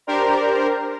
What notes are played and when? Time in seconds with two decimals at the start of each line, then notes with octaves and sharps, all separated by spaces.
0.07 D4 G4 A#4 C5 D5 A#5